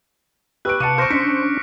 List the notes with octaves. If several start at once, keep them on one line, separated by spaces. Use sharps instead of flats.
G4 B4 C#6 E6 F#6 D7
C3 F5 A5 D6 C#7 D#7
C5 C#6 F6 A#6 D7
C#4 D4 B6 C#7